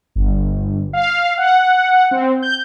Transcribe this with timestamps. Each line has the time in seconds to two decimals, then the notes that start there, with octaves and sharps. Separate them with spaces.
0.16 G1
0.93 F5
1.38 F#5
2.11 C4
2.42 G6